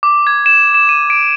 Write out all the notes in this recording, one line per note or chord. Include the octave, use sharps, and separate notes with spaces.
D6
G#6
E7
E7
D#7
D7